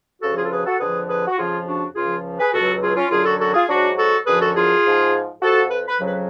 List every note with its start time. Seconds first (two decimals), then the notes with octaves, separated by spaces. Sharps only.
0.22 D2 C#3 F3 F#4 A4
0.37 F4 G#4
0.44 A4
0.51 G#4 B4
0.65 F#4 A4
0.80 F2 D3 F3 G#4 B4
1.09 G#4 B4
1.27 F#4
1.38 F2 C#3 F3 F4 G#4
1.66 D4 F#4
1.95 C#2 C#3 F3 F4 G#4
2.39 G#4 B4
2.52 C#2 B2 F#3 F#4 A4
2.82 F4 G#4
2.96 C#4 F4
3.11 F#2 D3 F#3 F4 G#4
3.25 F#4 A4
3.40 F#4 A4
3.54 F4 G#4
3.69 G#2 F#3 D4 F#4
3.97 F#4 A4
4.26 F#2 D3 F3 G#4 B4
4.41 F#4 A4
4.55 F4 G#4
4.84 G#2 F3
5.42 F2 F3 F#4 A4
5.70 B4
5.87 B4
6.00 F2 C#3 F#3 B4